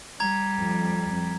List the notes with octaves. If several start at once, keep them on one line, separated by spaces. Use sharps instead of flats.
G3 A#5 G#6
F2